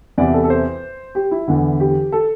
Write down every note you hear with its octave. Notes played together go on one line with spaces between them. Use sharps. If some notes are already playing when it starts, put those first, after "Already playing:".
E2 C3 E3 D5
A4
A4
C5
G4
E4
E2 D3
G4
A4